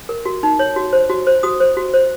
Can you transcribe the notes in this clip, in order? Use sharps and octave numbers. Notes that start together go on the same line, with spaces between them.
A#4
F#4
D#4
C#5
F#4
C5
F#4
C5
F#4 D#6
C5
F#4
C5